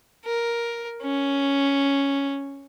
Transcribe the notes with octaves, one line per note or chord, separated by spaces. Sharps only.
A#4
C#4